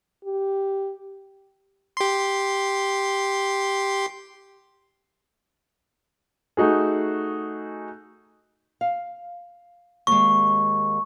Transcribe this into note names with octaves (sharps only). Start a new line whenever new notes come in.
G4
G4 C6
A3 D#4 F#4 G#4
F5
D#2 G#3 C#6